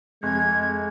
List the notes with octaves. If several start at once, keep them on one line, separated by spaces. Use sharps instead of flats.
F1 G#3 G#6